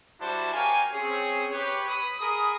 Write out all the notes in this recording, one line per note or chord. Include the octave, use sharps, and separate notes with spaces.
G3 D4 E4 F#4 C5 A5
G4 A#4 C#5 F5 G#5
C4 C#4 G#4
G4 B4 C#5
B5 D#6
G#4 A#4 B5 D#6